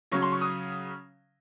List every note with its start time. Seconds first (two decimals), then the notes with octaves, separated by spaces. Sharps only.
0.12 C#3 F#3 C#4 C#6
0.22 C6
0.32 C#6
0.41 D#6